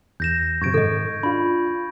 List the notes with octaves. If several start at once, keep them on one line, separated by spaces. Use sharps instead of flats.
E2 G6 A#6 E7
F#2 C3 C#6 G#6 D7
G#2 D#3 A4 D#5
D4 F4 B5